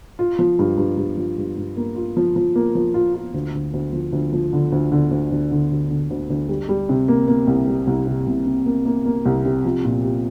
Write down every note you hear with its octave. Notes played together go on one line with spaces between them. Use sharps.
F4
F3
G2
G2
G2
F3
G2
G2
A#3
F4
F3
F3
A#3
F3
F4
F4
D2
D2
D2
F3
D2
F3
D3
D2
D3
D2
D2
D3
D2
D3
D2
D2
G3
G3
C3
A#3
A#3
C2
G3
C2
C3
C2
C3
A#3
A#3
A#3
C2
C3
F3
A#2
G4